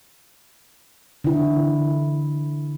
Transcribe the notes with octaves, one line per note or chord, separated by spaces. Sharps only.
D3 E4